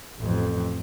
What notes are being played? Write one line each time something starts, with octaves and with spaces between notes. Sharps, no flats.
A1 F2